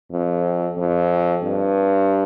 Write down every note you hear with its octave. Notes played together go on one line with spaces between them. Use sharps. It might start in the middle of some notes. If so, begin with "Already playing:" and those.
F2
F2
G2